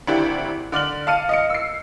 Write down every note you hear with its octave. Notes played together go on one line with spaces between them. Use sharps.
G#1 D2 D4 E4 G4
D3 D5 F6 F#7
F5 A5 F6 C#7 D#7
D#5 F5 C#7
E6 C7